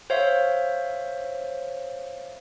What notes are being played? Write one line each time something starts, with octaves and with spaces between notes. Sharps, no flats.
C5 C#5 E5 F5